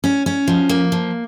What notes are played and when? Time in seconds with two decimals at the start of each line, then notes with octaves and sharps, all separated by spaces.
0.04 C#4
0.26 C#4
0.48 F3
0.69 A#3
0.92 F3